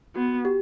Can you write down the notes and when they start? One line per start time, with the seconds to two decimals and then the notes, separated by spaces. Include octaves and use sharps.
0.15 B3 F#4
0.45 G4